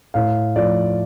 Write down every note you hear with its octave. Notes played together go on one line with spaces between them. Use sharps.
A2 F5
F3 A3 D5